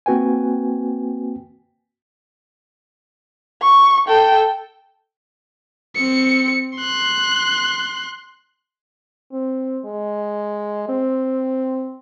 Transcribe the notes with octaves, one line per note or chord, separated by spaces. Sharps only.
A#3 C4 F#4 B4 G5 G#5
C#6
A4 G5
C4 C#7
C6 F#6
C4
G#3
C4